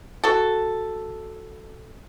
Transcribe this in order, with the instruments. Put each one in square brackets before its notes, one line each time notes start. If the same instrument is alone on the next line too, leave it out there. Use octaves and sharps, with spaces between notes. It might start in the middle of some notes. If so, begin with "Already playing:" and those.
[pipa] F#4 A4